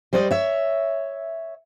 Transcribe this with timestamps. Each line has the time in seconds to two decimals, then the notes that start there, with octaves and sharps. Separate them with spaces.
0.13 G3 C5 D5 D#5
0.31 C#5 E5